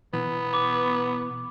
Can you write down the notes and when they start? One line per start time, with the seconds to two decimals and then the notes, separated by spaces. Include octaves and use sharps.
0.14 B2 E3 B3
0.54 D6